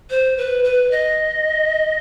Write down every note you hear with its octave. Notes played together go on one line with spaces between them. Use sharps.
C5
B4
B4
D#5